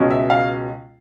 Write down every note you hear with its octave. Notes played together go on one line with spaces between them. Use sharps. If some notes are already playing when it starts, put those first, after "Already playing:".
Already playing: C#2 B2 G#3 C#4
E5
F5